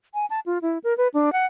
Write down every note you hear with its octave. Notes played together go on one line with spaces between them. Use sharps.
G#5
A5
F4
E4
A#4
B4
D4
F#5